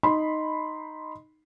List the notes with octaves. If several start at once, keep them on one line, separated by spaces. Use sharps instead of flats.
D#4 B5 C6